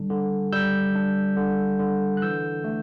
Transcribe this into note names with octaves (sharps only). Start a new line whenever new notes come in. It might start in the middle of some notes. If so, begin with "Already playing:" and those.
Already playing: D3 G3 D4
D3
G3 E6 G6
D4
D3
D3
F#6
E3 E6 G6
A3